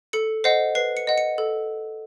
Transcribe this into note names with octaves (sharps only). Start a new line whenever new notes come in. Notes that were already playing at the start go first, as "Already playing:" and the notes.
A4 C#7
C5 D#5 F#5 C7
B4 C7
C#7
D#5 F#5
C#7
A4